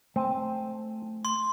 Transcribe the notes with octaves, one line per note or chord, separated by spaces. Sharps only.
A3 C4 G#5 A5
C6